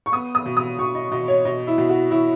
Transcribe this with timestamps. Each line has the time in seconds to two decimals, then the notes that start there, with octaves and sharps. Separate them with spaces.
0.06 C#6
0.12 B3 D#6
0.35 D#6
0.46 B2
0.57 D#6
0.78 B2 C#6
0.95 D#5
1.11 B2 D#5
1.28 C#5
1.45 B2 D#5
1.67 E4
1.78 B2
1.89 F#4
2.11 B2 E4